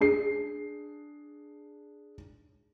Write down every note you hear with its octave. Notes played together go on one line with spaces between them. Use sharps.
D4 G#4 C7